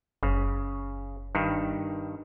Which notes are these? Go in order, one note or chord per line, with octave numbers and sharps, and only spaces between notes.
F#1 C#3
G2 D#3